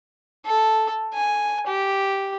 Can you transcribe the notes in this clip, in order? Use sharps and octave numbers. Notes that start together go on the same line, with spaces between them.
A4
G#5
G4